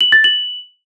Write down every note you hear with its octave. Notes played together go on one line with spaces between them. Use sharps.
F#7
A6
F#7